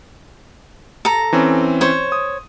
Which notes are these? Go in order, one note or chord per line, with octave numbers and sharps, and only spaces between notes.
A4 A#5
E3 C4 C#4
C5 C#5
D#6